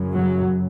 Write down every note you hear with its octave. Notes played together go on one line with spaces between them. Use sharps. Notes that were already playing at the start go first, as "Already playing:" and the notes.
Already playing: F#2 C#3
F#3